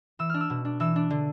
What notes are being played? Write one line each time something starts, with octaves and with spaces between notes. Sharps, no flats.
E3 E6
D4 F6
E6
B2
D4
E3 E6
D4
D3